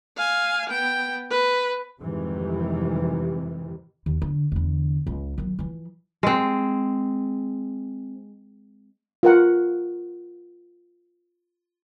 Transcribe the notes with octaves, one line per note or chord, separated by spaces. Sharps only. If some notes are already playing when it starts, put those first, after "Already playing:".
F5 G#5
B3 G5
B4
F2 G#2 C3 D#3 E3 G3
D#2
D3
E2 D3
C#2
D#3 F#3
E3 F3
G#3 C4
F4 A#4 F#5